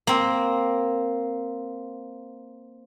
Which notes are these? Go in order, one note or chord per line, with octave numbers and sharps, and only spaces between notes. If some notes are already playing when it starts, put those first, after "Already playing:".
A#3 C4